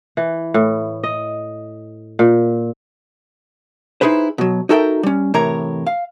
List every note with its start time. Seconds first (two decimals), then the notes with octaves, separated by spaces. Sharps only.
0.17 E3
0.54 A2
1.04 D#5
2.19 A#2
4.01 D#4 E4 G#4 B4 C5
4.38 B2 F#3
4.69 D#4 F#4 A4 A#4 E5 G5
5.03 G3 C#4
5.34 A2 C3 E3 A#4 C#5 A#5
5.87 F5